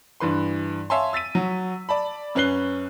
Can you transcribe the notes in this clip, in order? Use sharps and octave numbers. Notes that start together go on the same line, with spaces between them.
G2 E3 B4 C6
C#5 E5 F5 G#5 A5 C6
E6 A6 B6 D#7
F#3
D5 A5 B5
F#2 C#4 B4 F#6 C7 G7